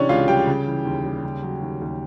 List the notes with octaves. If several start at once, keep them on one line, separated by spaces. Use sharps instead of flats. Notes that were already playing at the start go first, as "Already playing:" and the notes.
Already playing: C3 E3 C#4 D4 C#5 D5
C#2 F4 F5
G3 G4 G5
C#3
E3
D#2
G3
C#3
F#3
D#2
D#2